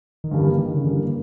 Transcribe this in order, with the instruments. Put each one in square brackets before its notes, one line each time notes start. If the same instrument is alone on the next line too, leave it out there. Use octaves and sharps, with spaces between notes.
[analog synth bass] D#3
[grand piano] G2 E3 G3 A#3 [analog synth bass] D3
[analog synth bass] D#3
C#3
[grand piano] G2 E3 G3 A#3 [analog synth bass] D3